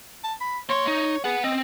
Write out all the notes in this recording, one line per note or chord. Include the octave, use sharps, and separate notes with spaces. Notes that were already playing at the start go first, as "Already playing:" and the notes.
A5
B5
A#3 C#5 C6
D#4
G#4 B4 F#5
C4 D#5